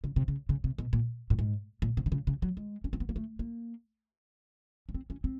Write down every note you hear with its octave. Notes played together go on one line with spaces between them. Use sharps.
C#3
C3
C#3
C#3
C3
B2
A#2
A2
G#2
A#2
C3
D3
C#3
C#3
F#3
G#3
C#4
C4
B3
A#3
A3
A#3
C#4
C4
C#4
C4